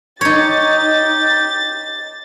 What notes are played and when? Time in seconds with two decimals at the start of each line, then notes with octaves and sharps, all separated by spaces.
0.21 D#4 G4 C#5 A6